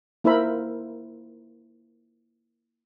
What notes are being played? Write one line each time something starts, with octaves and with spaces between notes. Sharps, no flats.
A#3 E4 A#4 C5 E5 B5